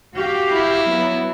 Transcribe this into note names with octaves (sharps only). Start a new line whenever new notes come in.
F#4 G4 F5
E4
F#3 B3